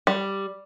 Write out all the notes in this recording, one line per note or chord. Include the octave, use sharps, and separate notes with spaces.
G3